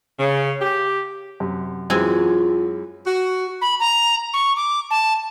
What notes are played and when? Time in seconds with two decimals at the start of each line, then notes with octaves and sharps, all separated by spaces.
0.20 C#3
0.61 G4
1.40 F#2 C3
1.90 F#2 E3 F#3 G#3 C4 F4 G#5
3.06 F#4
3.62 B5
3.80 A#5
4.34 C#6
4.56 D6
4.91 A5